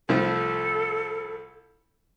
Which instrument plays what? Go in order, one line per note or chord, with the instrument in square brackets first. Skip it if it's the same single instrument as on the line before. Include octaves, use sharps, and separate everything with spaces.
[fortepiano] C2 F3 A3 [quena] A4